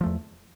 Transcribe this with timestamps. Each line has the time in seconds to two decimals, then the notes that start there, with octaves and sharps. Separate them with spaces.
0.01 F3
0.03 A3
0.06 E2